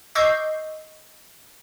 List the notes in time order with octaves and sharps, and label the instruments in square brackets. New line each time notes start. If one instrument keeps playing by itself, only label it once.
[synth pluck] D#5 C#6 D6 E6 G6 C7